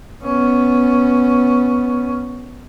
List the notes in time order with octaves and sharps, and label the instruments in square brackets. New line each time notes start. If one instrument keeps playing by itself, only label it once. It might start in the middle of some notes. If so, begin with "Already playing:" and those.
[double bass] B3 C#4